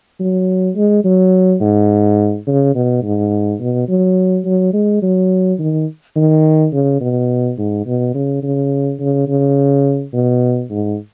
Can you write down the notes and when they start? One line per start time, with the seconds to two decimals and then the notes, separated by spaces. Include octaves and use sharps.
0.20 F#3
0.76 G#3
1.04 F#3
1.61 G#2
2.47 C#3
2.75 B2
3.03 G#2
3.60 B2
3.89 F#3
4.45 F#3
4.73 G#3
5.02 F#3
5.59 D#3
6.16 D#3
6.73 C#3
7.01 B2
7.58 G#2
7.86 B2
8.14 C#3
8.43 C#3
9.00 C#3
9.28 C#3
10.13 B2
10.70 G#2